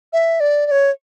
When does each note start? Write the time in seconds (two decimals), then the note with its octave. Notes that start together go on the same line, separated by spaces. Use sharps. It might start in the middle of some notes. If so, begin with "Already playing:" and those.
0.13 E5
0.40 D5
0.66 D5
0.71 C#5